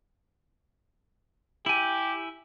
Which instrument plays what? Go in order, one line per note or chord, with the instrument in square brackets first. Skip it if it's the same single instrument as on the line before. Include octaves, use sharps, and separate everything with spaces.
[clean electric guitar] E4 G#5 [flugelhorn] G4